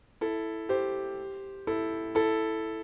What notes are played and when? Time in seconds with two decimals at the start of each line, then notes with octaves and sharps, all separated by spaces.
0.21 E4 A4
0.69 G4 C5
1.67 E4 A4
2.15 E4 A4